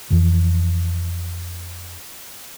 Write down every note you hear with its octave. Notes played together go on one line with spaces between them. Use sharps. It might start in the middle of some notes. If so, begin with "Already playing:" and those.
F2 E3 F3